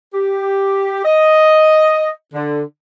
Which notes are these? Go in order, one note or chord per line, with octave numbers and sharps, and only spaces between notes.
G4
D#5
D3